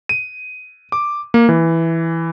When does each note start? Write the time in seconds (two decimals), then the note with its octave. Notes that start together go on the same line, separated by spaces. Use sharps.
0.09 D#7
0.92 D6
1.34 A#3
1.49 E3